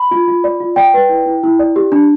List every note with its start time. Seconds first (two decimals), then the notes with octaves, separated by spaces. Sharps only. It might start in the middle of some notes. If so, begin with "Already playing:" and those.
Already playing: B5
0.11 F4
0.28 F4
0.44 D5
0.60 F4
0.76 D5 G5
0.94 B4
1.09 E4
1.26 E4
1.43 E4
1.59 D5
1.76 G4
1.92 D4